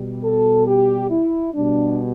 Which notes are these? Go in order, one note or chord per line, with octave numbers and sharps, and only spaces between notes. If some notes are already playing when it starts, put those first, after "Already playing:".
Already playing: B2 G3
A4
G4
E4
B2 G3 D4